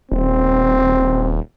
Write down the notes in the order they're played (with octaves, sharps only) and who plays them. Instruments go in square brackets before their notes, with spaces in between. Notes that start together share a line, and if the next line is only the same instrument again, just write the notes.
[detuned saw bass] D#1 [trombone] C4